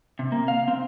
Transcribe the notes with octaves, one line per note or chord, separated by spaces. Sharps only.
C3
A#3
F5
C4